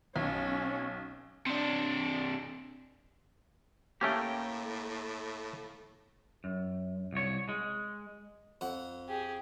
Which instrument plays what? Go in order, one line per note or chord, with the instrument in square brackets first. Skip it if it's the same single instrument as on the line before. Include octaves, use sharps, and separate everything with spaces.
[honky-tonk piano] B1 [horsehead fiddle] C#4 C#5
[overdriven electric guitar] C3 D4
[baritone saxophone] A2 [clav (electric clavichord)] A3 C#4 G4 [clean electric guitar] A#3 G5
[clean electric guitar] F#2
C2 C#5
G#3
[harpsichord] F2 F#5
[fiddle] G4 G#4